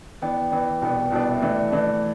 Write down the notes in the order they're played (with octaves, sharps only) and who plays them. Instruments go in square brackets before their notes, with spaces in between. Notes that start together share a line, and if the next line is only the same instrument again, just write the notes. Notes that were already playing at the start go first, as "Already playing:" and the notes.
[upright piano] E3 B3 D4 [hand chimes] G5
[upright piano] E3 B3 D4 [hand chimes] G5
[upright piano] C2 B2 B3 D4 [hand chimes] G5
[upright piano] C2 B2 B3 D4 [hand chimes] A5
[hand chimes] G5
E5
[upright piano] E3 A3 D4 [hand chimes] E5
[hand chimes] D5
[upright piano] E3 A3 D4